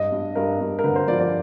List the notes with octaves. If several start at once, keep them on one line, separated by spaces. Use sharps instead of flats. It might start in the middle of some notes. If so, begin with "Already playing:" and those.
Already playing: G2 D#5
G2
G2 A#4
G2
A#4
D3 B4
C5
F3 D5
D5